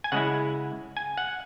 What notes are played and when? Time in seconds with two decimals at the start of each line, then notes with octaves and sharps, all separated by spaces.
0.04 G#5
0.12 C#3 G#3 E4 F#5
0.97 G#5
1.18 F#5